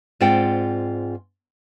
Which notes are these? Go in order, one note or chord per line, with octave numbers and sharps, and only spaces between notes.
G#2 C4 F4 D5 F#5 G5